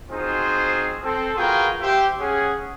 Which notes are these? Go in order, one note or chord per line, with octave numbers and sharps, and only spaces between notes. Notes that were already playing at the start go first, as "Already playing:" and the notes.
C4 D#4 F4 F#4 G#4 C5
C4 A4
F4 F#4 G#4 A#4 B4 G5
G4 C5 E5 G5
C#4 G#4 F#5